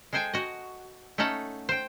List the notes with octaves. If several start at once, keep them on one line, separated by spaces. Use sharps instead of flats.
G#3 A4 C5 G5 G#5
F#4 D#5
A3 C#4 D#4 A4 F#5
C5 G5